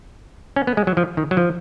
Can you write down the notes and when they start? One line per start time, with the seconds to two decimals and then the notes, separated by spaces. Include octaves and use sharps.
0.56 C#4
0.67 B3
0.77 G#3
0.87 F#3
0.97 F3
1.17 D#3
1.31 F#3
1.37 F3